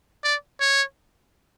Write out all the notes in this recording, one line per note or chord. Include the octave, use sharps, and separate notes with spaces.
D5
C#5